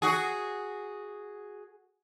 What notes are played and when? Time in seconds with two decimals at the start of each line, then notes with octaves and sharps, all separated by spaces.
0.02 F#4 G#4